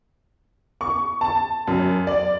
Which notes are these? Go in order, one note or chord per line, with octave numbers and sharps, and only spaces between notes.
C#6
A5
F#2
D5